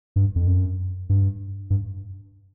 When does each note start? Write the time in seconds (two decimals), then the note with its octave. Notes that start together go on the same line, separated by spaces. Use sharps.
0.16 G2
0.36 F2
0.47 F#2
1.09 G2
1.70 G2